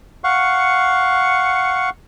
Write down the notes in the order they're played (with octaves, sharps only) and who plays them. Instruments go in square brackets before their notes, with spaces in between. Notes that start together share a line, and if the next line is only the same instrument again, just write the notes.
[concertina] F5 F#5 C#6